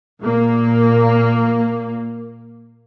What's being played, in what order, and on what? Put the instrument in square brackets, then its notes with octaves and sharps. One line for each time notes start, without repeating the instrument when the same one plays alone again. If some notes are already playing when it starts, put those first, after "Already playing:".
[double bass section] A#2 A#3